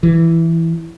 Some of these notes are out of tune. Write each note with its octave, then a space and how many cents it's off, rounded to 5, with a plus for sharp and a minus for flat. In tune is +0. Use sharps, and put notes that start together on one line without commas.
E3 +5